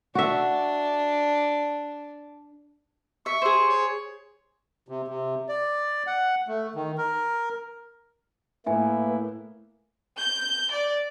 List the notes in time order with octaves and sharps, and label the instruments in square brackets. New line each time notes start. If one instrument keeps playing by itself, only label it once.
[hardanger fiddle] D4 [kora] F#4 E5
[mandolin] E5 [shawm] C#6
[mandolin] G#4 C5
[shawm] C#5
[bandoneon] C3
C3
D5
F#5
A3
D#3
A#4
[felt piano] A2 [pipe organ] A#3 E4 [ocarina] B4 [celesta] E5 G#5
[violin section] G6
D5